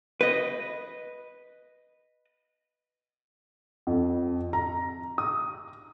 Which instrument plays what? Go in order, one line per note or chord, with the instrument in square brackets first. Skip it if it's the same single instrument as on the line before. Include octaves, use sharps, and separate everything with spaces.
[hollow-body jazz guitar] B4 D#5
[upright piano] F2
A#5
D#6